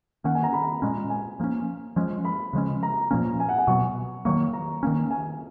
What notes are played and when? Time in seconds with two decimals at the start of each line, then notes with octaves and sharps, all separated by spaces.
0.24 D#3 A#3 C#4 F#5
0.35 G#5
0.43 A#5
0.53 B5
0.82 A#2 G#3 C#4
1.10 G#5
1.40 F3 A#3 C#4
1.96 F3 G#3 C#4
2.25 B5
2.53 C#3 F3 G#3 C#4
2.83 A#5
3.11 A#2 F3 A#3 C#4
3.40 G#5
3.49 F#5
3.58 G#5
3.67 B2 F#3 B3 C#6
4.25 D#3 F#3 A#3 C#6
4.53 A#5
4.83 D#3 A#3 C#4
5.11 G#5